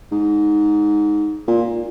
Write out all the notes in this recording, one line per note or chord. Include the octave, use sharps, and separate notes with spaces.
G#2
A#2